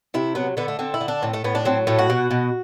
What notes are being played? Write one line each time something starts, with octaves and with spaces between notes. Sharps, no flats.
C3 E4
F#3 B3
D3 B3
A3
D3 C4
E4
D3
D4
A2 C4
A3
A2 B3
D4
F#3 C4
A2 A3
F#4
B2
B2